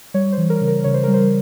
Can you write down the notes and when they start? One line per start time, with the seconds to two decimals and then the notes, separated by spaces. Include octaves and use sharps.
0.14 G3 C#5
0.32 C5
0.38 E3
0.50 A#4
0.61 C#3
0.68 A#4
0.84 C#3 C#5
0.94 C5
1.04 G3 A#4
1.14 C5